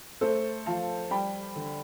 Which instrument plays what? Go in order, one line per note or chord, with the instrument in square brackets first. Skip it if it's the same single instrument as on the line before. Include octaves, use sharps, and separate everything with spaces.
[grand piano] A3 A4 C5
F3 F5 A5
G3 G5 B5
D3